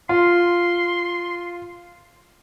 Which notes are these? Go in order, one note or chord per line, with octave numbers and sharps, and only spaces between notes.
F4 C6